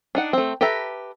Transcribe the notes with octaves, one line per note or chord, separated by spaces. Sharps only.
D4 D#4 F#5
A3 C4
G4 A4 B4 E5 A#5